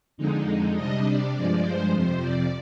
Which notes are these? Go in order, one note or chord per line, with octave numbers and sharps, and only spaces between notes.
F2 D3 G#3 D#4
C3 G3 D4 D#5
D5
G2 F3 G#3 D5
C5
F2 C3 F3 C5
D5